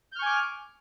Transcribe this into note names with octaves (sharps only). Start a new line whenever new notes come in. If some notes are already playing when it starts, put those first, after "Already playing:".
G#5 C#6 D6 F6 G6